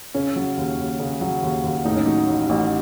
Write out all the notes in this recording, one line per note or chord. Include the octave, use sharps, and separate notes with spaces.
C#3 C#4
F#3
D#2
D#2
C#3
F#3
D#2
D#2
A2 D#4
C#4
F#3 D#4
A1
A1